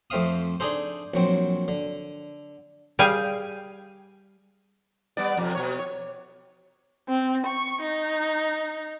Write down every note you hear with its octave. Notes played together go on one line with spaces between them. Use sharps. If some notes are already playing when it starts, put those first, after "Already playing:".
F2 A3 C4 E5 F5 D#6
D4 D#4 G#4 A4 C5
A#1 F#3 C4
D3
G3 G#4 F5 G5 G#5
G3 B3 D5
F2 C3
B2 C#5
C#5
C4
C#6
D#4